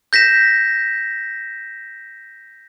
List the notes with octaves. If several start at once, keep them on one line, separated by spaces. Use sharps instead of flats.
G6 A#6 B6 E7